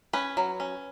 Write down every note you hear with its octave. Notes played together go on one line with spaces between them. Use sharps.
C#4 B4
F#3
C#4